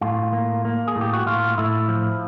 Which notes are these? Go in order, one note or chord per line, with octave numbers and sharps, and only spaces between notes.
A2 F4
A#3
A#3
G#4
A2
G4
F#4
A2 F4
A2 E4
F3